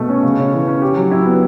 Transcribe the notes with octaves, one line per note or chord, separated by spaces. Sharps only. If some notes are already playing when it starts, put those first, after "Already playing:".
Already playing: B2 A3
C#4
C#3
C#4
E3
C#4
G4
F#3
E4
B3